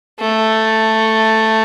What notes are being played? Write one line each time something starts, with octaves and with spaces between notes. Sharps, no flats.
A3